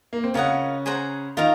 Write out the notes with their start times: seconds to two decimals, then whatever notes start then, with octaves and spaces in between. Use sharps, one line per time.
0.13 A#3
0.24 C4
0.34 C#3 C#4 F4 A#4 D#5 F#5
0.86 G#4 C5 F#5 A#5
1.37 D#3 D#4 F4 A#4 F5 A#5